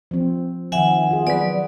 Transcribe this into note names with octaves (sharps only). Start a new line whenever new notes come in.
F3 C4
D#3 F3 E5 F#5 G#5
F4 G#4
F#3 B3 B4 D5